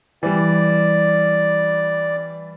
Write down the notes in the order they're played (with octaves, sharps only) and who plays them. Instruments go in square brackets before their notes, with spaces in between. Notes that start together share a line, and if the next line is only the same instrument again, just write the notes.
[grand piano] E3 G3 [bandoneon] D5